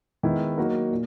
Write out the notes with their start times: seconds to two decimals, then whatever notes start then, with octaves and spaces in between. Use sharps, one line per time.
0.23 D#3 G#3 B3 E4
0.58 F#3 A#3 D#4 F#4 A#4
0.91 A#2